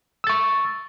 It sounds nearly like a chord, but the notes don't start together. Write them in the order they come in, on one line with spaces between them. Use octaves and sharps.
E6 A6 C#6